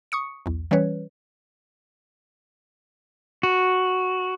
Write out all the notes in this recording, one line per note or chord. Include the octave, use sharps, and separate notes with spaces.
C#6 D#6 C#7
B1 E2
E3 G3 C#4 B4 C#5
F#4